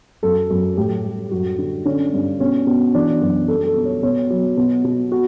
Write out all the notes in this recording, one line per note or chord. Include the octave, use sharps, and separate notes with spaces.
F#2 A4
F#2
A2 G4
G3
F#2 F#4
D3
D3 C#4
G2
B2 C#4
B2
E3 D4
F#2
G3 A4
A4
B2
C#5
B2 C#5
F#3
B2
B2
F#4